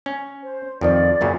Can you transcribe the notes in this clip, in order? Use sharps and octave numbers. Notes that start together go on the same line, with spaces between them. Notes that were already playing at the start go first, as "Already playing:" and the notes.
C#4
C5
F2 D#3 F3 D5
F#2 A#2 C#3